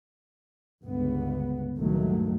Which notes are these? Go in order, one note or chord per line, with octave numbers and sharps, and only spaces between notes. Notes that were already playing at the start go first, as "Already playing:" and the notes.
G1 C#2 B3
C#2 G2 A#2 D#3 F#3 A3